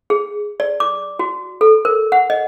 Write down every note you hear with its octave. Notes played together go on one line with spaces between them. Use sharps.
G#4
D5
D6
F#4
A4
A#4
F#5
D#5